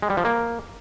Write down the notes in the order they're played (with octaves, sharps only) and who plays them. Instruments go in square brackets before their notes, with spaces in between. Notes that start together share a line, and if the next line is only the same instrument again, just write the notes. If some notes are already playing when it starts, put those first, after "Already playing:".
[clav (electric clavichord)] G#3
G3
F3
A#3